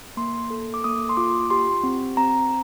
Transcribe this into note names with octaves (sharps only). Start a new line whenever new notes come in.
A#3 C6
A4
D6
A#3 D#6
C6
F4 D6
G4 C6
C4
C4 A#5